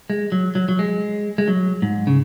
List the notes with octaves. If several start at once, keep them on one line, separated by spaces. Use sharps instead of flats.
G#3
F#3
F#3
F#3
G#3
G#3
F#3
G#2
C#3